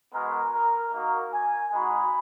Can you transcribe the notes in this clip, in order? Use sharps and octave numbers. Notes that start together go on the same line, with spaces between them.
G#3 B3 F#4 A#4
A#4
A#3 D#4 F#4 A#4
G#5
G#3 D#4 F#4 B5